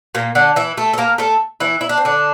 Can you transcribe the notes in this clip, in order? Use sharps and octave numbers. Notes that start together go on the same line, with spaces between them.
A#2 A#3
D3 D4
E3 E4
A3 A4
A4
A#3 A#4
A3 A4
E3 E4
E4
D4
C4
D3 D4